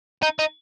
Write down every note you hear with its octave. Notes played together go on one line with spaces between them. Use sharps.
D#4
D#4